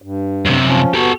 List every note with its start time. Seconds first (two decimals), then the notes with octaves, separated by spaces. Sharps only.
0.02 G2
0.46 F#2 C3
0.65 F3 C#4
0.94 B3 F#4 G4 A4